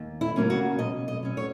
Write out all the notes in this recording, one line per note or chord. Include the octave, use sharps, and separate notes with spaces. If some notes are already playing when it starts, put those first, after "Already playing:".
Already playing: D#2
E4
C#3 F#3 A#3 C#4
F#4
B2 D#5
D#5
F#3 C#4
C#5